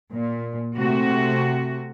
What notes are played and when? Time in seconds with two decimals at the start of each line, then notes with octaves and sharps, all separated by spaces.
0.11 A#2
0.76 C3 A3 F#4